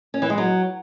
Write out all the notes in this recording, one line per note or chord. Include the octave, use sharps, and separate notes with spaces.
C#4
E3
G#3
F#3